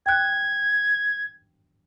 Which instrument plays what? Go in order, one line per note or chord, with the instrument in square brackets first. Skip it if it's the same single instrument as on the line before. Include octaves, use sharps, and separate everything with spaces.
[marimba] G5 F#6 [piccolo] G#6